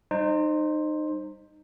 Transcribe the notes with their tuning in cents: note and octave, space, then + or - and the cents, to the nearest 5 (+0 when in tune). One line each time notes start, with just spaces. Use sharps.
G3 +0 D#4 -25 C5 +10